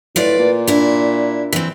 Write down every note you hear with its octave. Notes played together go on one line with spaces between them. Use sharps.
A2 F4 B4 D5
A#2
D4 E4
E3 C4